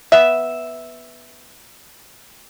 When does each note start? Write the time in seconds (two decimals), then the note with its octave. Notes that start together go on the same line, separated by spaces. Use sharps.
0.12 B3 E5